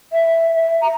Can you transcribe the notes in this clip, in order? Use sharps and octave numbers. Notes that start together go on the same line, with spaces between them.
E5
E5
A#5